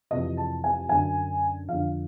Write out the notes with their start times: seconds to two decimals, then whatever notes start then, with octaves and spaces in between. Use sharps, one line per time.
0.11 F2 C3 E3 D#5
0.37 A5
0.64 G#5
0.89 F#2 D3 G#5
1.69 F2 D3 F5